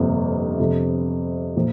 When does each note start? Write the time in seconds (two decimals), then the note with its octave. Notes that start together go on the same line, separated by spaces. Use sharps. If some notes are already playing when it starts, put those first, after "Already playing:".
Already playing: G1 F2 C3 F3 A#3
0.59 F2 C3 F3
1.56 A#2 F3 A#3